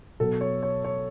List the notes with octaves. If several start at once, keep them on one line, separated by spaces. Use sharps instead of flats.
B2 F#3 B3 A4
C#5
C#5
C#5